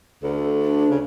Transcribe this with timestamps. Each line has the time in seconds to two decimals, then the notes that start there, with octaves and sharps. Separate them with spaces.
0.23 D2 A4
0.61 D4
0.90 C#3